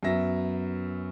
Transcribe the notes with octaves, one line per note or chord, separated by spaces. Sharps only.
F#2 F#3 B3 E5 A#6